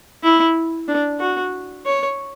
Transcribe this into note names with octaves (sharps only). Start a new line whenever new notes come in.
E4
D4
F#4
C#5